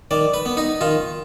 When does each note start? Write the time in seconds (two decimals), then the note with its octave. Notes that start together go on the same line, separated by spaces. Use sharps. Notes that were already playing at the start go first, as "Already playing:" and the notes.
0.11 D#3 D5
0.34 B4
0.46 B3
0.57 D#4
0.81 D#3 F4